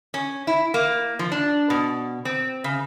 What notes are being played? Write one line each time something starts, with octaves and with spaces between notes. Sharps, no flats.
C#4
E4
A#3
F3
D4
B2
C4
C#3